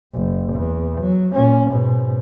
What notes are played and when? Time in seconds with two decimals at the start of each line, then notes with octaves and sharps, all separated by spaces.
0.14 F#1
0.54 E2
1.01 F#3
1.35 A#2 C#4
1.71 G#2 B2